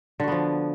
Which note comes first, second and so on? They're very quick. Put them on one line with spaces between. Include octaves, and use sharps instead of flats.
D3 F#4 B3 F3